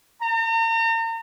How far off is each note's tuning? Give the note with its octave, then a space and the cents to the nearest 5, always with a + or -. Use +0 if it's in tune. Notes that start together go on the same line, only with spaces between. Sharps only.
A#5 -40